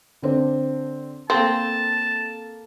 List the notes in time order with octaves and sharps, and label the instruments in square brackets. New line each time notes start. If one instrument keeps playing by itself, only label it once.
[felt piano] D3 C4 D4
[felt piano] A#3 A4 [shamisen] C4 [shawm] A5